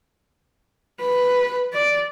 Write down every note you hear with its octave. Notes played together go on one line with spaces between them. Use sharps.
B4
D5